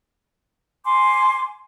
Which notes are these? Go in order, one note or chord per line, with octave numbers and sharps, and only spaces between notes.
G#5 C6 D6